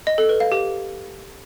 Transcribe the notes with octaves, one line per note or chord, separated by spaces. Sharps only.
D#5
A4
B4
F5
G4